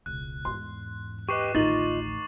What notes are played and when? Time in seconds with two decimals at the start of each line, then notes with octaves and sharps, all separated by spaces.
0.06 E1 C#2 F#6
0.45 E2 G#2 C6
1.29 G4 B4 D#5 C#6 D6 C7
1.55 A1 D2 D#3 D#4 F4 D#5 A6 F#7